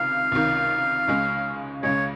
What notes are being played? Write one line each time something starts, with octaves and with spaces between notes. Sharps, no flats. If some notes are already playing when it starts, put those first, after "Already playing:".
Already playing: C#2 C3 D#3 F5
C#2 C3 D#3
C#2 C#3 G#3
C#2 C#3 G#3 C#5